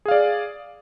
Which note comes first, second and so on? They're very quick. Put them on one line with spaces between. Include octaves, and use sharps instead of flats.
G#4 F5 D5